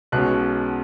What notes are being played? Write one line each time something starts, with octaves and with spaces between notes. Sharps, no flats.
B1 B2 G#3 C#4 F#6